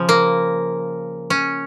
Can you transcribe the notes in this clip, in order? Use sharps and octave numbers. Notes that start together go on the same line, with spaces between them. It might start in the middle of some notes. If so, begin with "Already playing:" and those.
Already playing: C#3 F3
A#3
C#4